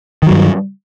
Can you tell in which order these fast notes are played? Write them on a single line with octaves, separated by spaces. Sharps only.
D#3 F#3 G2